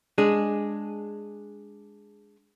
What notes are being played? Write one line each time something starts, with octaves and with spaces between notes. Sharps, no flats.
G#3 D4 G#4